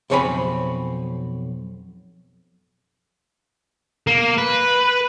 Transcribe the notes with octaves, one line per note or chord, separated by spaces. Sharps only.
B1 F2 C4 C#5 G#5 B5
A#3
B4